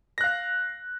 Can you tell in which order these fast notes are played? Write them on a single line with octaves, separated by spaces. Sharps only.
A#6 F#6 F5